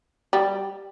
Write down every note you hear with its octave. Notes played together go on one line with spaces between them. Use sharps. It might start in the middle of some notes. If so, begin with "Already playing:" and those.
G3